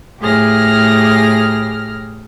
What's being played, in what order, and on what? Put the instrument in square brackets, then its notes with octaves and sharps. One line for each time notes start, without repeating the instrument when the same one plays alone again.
[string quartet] A2 G4 G#4 F6 A#6